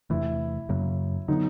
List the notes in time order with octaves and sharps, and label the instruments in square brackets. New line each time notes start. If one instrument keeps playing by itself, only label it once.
[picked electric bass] E2 C3 E3 A3 [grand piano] E4
[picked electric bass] F#2 C#3 F#3 A#3
[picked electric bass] D3 F#3 B3 [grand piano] D#4